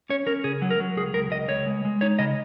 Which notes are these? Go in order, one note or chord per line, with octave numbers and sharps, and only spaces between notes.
C#4 C#5
C#4 A#4
C#3 G#4
F#3
A#4
F#3
C#2 G#4
C#2 A#4
C#2 D#5
C#2 C#5
G#3
G#3
D#4 C#5
C#3 D#5